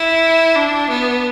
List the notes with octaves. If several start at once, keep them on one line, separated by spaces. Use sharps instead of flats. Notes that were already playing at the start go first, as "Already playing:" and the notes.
Already playing: E4
D4
B3